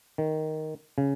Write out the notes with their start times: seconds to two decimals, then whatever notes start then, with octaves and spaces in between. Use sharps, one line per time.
0.18 D#3
0.98 C#3